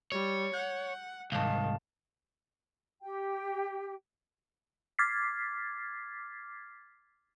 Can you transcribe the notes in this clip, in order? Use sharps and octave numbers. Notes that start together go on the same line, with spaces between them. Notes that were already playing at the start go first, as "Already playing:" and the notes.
G3 C#5
F#5 G6
C2 G#2 D#3 F5 A5
G4 G5
D6 F6 G#6 A6 B6 C7